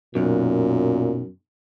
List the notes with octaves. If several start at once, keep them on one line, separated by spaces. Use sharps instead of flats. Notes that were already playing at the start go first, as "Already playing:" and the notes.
B1 F#2 A#2